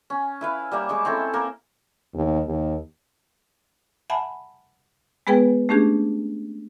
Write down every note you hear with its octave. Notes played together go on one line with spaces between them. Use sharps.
C#4
E4 B4 F5
G3 A#3 E5
G#3 C#6 D6
C4 C#4 E4 A4
A#3 A#4
D#2
D#2
E5 F#5 G#5 A5 B5
G#3 B3 G#4 B4 G5
A3 C#4 D4 G4 G#4